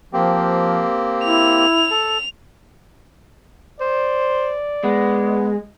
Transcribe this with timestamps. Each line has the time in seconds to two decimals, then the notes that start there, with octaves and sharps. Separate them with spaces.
0.13 F3 A#3 C4 G4
1.24 E4 F7
1.91 A4
3.80 C5 D5
4.84 G#3 B3